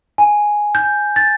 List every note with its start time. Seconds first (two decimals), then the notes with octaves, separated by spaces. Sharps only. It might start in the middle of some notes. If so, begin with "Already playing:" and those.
0.18 G#5
0.75 G6
1.16 A6